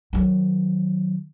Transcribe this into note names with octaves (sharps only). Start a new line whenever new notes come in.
D#3 F#3